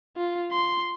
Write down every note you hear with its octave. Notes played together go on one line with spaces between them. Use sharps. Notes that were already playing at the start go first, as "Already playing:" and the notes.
F4
C6